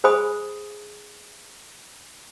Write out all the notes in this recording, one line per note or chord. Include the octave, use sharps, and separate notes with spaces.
G#4 C5 G#5 B5 D#6